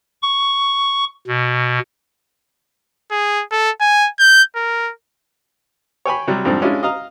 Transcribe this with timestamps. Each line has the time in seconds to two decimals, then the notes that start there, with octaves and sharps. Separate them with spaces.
0.22 C#6
1.28 B2
3.11 G#4
3.51 A4
3.81 G#5
4.19 G6
4.56 A#4
6.06 C#5 G5 G#5 B5
6.27 C3 F#3 G3
6.45 F2 G#2 G3 C4 D4
6.62 G#3 C#4 D4 E4 F4
6.83 D#5 F5 A#5